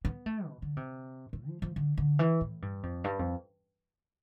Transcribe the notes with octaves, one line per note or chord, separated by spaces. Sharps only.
B3
A3
B2
D3
C3
A2
F3
F3
D3
D3
E3
A2
G2
F2
G2
F2